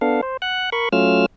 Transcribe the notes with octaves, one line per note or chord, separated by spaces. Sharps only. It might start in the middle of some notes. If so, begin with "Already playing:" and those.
B3 D4 A4 F5
C5
F#5 F#6
A#4 B5 C#6
F#3 A3 C#4 F4 E6 F6